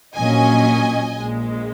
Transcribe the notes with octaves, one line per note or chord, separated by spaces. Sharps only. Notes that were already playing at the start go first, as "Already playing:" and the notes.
A#1 A#2 F#3 C#4 D#5 G#5
A#1 A#2 G#3